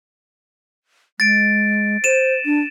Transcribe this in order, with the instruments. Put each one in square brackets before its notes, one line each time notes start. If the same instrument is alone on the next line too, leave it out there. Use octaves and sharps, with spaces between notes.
[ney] G#3 [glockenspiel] A6 D7
[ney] C5 [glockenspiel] D#7 E7
[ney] D4